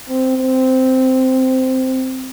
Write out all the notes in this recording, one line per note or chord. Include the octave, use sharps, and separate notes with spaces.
C4
C4